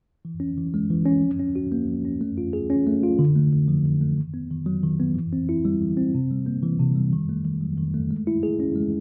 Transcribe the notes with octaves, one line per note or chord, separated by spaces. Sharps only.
E3
C#4
E3
G#3
E3
C#4
F3
C#4
F#4
A#3
F3
C#4
A3
F4
G#4
C#4
A3
F4
D3
A3
D3
F3
D3
A3
D#3
B3
D#3
F#3
D#3
B3
E3
C4
E4
G3
E3
C4
C3
G3
A#3
E3
C3
G3
D#3
A3
D#3
F#3
D#3
A3
G#3
E4
G#4
C#4
G#3